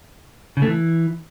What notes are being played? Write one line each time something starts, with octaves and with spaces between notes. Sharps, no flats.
C#3
A3
E3